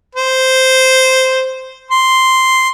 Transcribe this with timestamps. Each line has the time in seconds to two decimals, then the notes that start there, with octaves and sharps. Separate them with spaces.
0.15 C5
1.91 C6